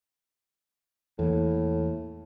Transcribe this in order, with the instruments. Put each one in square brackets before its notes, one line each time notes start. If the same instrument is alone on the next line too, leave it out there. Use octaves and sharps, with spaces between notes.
[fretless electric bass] E2 E3 A#3 [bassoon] A2